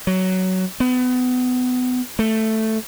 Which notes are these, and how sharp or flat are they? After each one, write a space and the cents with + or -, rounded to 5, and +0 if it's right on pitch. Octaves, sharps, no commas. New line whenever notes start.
F#3 +10
B3 +30
A3 +5